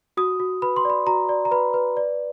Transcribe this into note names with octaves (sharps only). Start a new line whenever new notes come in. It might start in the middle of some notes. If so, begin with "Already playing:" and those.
F#4 D#6
F#4
B4 B5
C6
D5 B5
F#4 A#5
D5
A#5
B4 B5
B4
D5